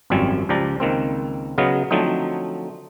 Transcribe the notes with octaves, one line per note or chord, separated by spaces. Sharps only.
G#1 F#2 F3 G3 C4 G#5
C#2 F3 G4 D5 A#5
C#2 D#3 A#3 C4
C#3 F#3 B3 D#5 F5
D3 F3 F#3 A3 C4 D#4